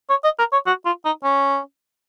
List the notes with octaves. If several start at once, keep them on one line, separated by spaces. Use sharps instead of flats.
C#5
D#5
A#4
C#5
F#4
F4
D#4
C#4